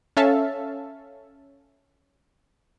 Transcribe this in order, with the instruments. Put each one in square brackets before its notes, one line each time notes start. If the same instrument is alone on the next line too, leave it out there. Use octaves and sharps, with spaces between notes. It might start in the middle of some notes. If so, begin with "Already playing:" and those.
[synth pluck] C#4 A4 E5 F5 A5